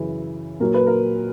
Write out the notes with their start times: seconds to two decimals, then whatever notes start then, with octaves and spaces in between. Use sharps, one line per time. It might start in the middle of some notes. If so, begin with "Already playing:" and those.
Already playing: F#2 C#3 E3
0.60 A#2 F#3 A#4
0.74 B4
0.87 A#4